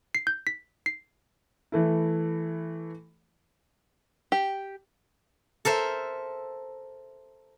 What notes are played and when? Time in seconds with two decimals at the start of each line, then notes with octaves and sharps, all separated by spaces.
0.15 C7
0.27 G6
0.47 B6
0.86 C7
1.72 E3 A3 E4
4.32 G4
5.65 A4 A#4 C5 E5